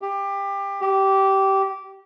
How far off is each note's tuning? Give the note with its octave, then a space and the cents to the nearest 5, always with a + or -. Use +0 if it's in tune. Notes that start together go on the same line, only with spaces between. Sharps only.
G4 +20
G4 -15